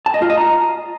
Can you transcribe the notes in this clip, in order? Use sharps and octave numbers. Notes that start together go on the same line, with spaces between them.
A5
D#5
F4
D#5
A#5